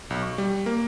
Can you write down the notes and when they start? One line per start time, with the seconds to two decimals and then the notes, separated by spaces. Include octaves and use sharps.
0.10 B1
0.23 C#6
0.38 G3
0.66 A#3